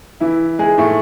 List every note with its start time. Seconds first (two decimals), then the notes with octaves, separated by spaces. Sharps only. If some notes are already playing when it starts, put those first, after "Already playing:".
0.20 E3 E4
0.59 G#3 G#4
0.78 A2 A3